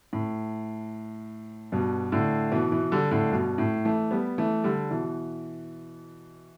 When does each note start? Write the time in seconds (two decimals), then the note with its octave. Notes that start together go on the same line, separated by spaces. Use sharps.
0.13 A2
1.72 G2 B2
2.12 A2 D3
2.52 B2 E3
2.72 B2 E3
2.92 D3 G3
3.11 A2 D3
3.31 G2 B2
3.58 A2
3.85 E3 A3
4.11 G3 B3
4.38 E3 A3
4.64 D3 G3
4.91 B2 E3